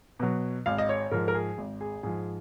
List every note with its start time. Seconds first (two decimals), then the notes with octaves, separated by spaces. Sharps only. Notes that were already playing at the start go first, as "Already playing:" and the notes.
0.19 B2 F#3
0.66 G#1 F5
0.78 D#5
0.89 C#5
1.11 G#2 F3 A#4
1.28 A#4
1.35 G#4
1.58 G#1
1.81 G#4
2.03 G#2 F3 G#4